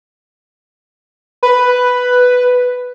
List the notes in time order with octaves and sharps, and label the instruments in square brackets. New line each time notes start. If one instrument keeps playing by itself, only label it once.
[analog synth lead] B4